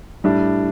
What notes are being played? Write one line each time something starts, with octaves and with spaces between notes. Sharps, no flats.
A2 G3 D4